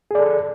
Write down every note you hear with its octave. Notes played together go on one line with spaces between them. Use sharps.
G#4 A4 D5